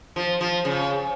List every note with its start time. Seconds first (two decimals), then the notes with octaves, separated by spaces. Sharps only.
0.16 F3
0.41 F3
0.65 C#3